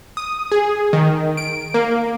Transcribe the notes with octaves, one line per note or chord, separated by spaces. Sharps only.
D#6
G#4
D#3
D7
A#3